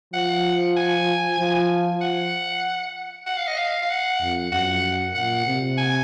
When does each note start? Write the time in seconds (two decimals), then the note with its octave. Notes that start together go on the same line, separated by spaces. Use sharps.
0.14 F3 F#5
0.77 G#5
1.39 F3
2.01 F#5
3.27 F#5
3.37 F5
3.47 D#5
3.58 F5
3.82 F5
3.90 F#5
4.21 F2
4.52 F#2 F#5
5.15 A#2 F#5
5.47 C3
5.78 G#5